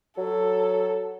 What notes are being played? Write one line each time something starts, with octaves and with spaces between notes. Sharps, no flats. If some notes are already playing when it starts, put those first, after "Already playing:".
F#3 A4